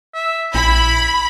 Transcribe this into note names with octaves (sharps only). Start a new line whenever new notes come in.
E5
A#1 E4 B5